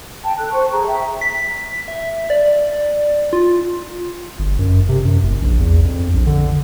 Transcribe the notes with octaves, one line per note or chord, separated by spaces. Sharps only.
G5 A5
A4 F#6
C5 A5 C#6
G#4 A#5
E5 G5
B6
E5
D5
F4
G1
F#2
C3
F#2
F#1
A#1
E2
F2
A#1
D3